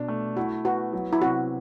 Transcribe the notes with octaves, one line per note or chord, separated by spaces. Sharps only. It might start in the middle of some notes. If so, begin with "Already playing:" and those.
Already playing: B2 D4
A3
E4 F#4
B3 F#4
F#3
E4
C3 F#4